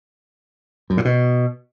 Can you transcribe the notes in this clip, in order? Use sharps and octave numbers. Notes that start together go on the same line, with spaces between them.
F#2
A2
B2